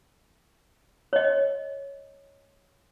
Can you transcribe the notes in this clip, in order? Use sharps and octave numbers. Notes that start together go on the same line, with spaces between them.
C#5 D#5